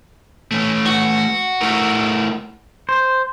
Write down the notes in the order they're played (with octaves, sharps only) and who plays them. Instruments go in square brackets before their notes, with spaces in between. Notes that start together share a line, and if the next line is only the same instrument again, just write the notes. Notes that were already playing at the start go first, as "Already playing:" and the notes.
[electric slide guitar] A3 C#4
[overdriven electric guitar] F#4
[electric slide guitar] A3 E4 A#4
[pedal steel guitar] C5